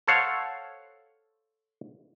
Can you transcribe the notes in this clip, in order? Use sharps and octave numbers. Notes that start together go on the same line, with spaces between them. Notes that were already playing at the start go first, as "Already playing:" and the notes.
A4 C5 C#5 F5 F#5